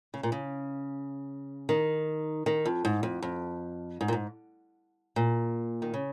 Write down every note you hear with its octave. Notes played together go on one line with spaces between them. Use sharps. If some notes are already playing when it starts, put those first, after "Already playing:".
C#3
A#2
C#3
D#3
D#3
F2
G#2
F2
F2
G#2
A#2
G#2
A#2
D#3
C#3